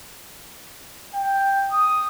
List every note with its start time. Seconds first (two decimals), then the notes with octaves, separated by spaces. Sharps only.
1.13 G5
1.70 D#6